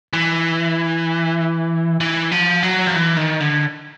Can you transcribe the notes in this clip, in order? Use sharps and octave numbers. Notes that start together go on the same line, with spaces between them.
E3
E3
F3
F#3
F3
E3
D#3
D3